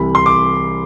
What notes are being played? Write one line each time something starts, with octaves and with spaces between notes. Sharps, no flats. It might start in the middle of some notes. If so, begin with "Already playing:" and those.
Already playing: C2 C3 E3 G3 B5
C6
D6